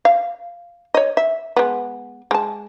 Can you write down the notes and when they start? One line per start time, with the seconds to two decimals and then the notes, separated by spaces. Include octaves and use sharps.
0.05 F5
0.94 C#5 D#5
1.17 E5
1.57 G#3 B3
2.31 G#3 A5